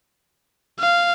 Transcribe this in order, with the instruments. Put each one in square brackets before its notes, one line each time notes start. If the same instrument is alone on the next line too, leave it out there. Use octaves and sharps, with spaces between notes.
[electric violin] F5